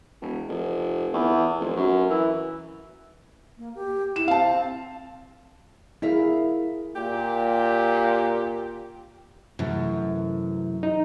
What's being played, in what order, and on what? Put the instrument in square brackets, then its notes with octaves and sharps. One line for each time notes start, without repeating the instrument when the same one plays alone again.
[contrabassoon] E1
F1
E2
F1
F#2
E3
[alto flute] A#3
G4
[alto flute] E4 [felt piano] E7
[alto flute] C4 [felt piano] F5 A5
[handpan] E4 G#4 [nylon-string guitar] A#4 E5 F5
[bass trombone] A#2 [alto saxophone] G4
[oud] F#2 [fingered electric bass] C3 E3 A3
[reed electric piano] D#4